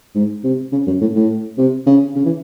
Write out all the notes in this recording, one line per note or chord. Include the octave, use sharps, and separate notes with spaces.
G#2
C3
C#3
F#2
A2
A2
C3
C#3
C#3
E3